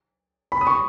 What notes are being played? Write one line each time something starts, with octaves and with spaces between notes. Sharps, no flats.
B5
D#6
C#6